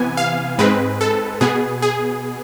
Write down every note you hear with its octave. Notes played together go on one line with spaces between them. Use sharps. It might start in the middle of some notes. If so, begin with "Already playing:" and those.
Already playing: C3 E3 B3 G#5
F5
G#2 G#3 C4 B4
A4
B2 B3 G#4
G#4